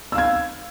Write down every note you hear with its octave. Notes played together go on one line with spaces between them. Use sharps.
F5 E6 G#6